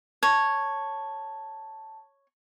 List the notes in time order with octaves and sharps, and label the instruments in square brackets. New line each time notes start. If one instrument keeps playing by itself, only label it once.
[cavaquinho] C#5 [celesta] A5